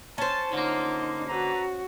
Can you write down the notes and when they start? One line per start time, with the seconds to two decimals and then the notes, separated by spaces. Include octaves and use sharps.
0.18 C#4 C5 A5
0.53 D3 A#3 D#4 F4
1.29 F#4 A4 B4 A#5